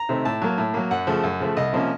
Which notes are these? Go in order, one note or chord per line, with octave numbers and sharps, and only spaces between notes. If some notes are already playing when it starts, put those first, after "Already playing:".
Already playing: A#5
C3 D#3 A3 C4
A2 A5
F#3 A#3
A2
F#3 A#3
F#2 F#5
C#3 F3 A3
F#2
C#3 F3 A3
C2 D#5
C3 F3 A#3 C#4